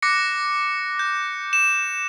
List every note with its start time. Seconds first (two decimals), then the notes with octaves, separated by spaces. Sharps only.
0.02 D6 F#6 A#6 C#7
0.99 G6
1.53 E7